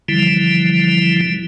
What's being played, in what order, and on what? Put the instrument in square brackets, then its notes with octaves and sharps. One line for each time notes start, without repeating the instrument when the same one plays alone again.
[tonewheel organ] D3 E3 F3 G3 E4